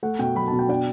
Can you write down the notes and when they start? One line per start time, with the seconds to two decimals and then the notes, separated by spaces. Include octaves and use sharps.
0.03 A3 F#5
0.19 B2 G5
0.35 F#3 B5
0.48 B2 A5
0.59 G5
0.69 D4 G5